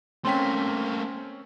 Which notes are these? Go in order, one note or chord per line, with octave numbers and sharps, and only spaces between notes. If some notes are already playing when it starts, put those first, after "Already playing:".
A3 A#3 C4 C#4 G5 C6 B6